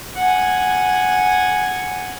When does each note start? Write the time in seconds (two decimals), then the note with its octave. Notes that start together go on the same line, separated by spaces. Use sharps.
0.16 F#5 G#5